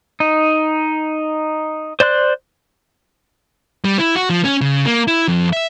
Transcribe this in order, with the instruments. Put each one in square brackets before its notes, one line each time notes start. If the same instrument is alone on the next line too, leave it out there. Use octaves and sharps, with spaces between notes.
[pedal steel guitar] D#4
C5 D5 C6 F#6
[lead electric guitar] G3
E4
F#4
F3
C#4
C#3
A#3
E4
F2
E5